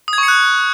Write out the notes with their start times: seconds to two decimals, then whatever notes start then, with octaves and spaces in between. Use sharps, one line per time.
0.08 D#6
0.13 G#6
0.18 C#6
0.23 C#7
0.28 F#6